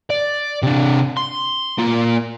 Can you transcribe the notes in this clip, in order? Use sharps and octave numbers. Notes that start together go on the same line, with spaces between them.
D5
C3 D4
C6
A#3 F4